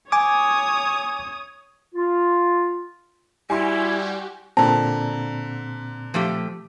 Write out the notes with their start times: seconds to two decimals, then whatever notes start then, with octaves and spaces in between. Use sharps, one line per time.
0.12 C#5 G#5 D6 D#6
1.95 F4
3.50 G3 E4 F#4 G4 G#5 C6
4.57 A#2 D3 C4 A5 A#5
6.14 F3 A3 G4